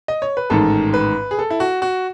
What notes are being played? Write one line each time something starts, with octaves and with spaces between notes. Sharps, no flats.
D#5
C#5
B4
A1 G#2 D#3 A4
B4
G#4
A4
E4
F#4
F#4